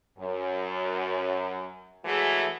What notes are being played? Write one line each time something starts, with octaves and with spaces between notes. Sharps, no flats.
F#2
E3 F#3 G#3 A3 F#4 G#4